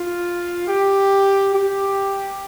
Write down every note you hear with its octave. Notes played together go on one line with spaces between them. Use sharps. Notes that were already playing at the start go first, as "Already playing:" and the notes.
Already playing: F4
G4
G4